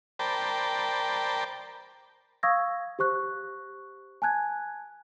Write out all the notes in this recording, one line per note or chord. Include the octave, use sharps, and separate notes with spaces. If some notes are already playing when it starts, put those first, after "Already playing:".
A#4 C5 D5 G5 A5 B5
F5 C#6 D#6 E6 G#6 A#6
G4 C5 C#6 F#6
G#5 A5 F#6 G#6